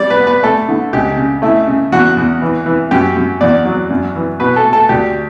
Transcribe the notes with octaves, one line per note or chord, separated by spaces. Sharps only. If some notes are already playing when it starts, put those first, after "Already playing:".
Already playing: G3 D5
B4
B3
B4
A3 A4
D3
C#2 G4
C#3
A3 E4
C#3
E2 F#4
E2
E3
E3
F#2 G4
F#2
E2 D5
F#3
F#2
E3
B2 B4
A4
A3
A4
D2 G4